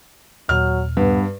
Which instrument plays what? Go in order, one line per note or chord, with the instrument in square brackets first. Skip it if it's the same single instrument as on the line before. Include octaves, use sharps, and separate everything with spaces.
[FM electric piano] D#2 A#2 [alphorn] F#3 [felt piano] F6
[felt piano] G2 [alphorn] B3